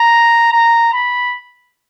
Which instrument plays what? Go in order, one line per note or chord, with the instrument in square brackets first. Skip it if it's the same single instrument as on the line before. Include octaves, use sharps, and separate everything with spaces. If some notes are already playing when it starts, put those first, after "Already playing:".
Already playing: [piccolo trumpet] A#5
A#5
B5